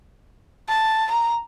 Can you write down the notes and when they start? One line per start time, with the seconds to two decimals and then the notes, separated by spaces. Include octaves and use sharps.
0.69 A5
1.11 A#5